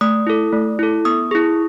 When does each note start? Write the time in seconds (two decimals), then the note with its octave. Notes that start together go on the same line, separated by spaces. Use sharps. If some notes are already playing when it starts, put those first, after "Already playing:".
0.01 A3 D#6
0.27 E4 A4
0.53 A3
0.79 E4 A4
1.05 B3 D#6
1.31 E4 G#4